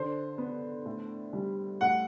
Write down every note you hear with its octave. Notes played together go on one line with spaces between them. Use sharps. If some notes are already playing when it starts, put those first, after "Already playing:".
Already playing: D3 C5
B3
A2
G3
A2 F#5